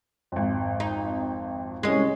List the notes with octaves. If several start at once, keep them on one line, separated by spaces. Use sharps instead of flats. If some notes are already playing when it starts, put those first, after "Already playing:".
G#1 F2
D#4
C2 G#3 C#4 D#5